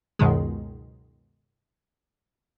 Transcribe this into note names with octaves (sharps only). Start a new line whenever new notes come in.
C#2 F#2 B2 D#3 G#3